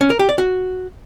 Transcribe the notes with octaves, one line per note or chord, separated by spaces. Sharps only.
C#4
A#4
G4
D5
F#4